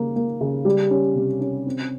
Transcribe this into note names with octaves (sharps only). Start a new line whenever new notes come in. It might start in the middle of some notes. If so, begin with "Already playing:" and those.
Already playing: C#3 G3 A#3
A#3
C#3
G3
C#4
C3
C#4
C4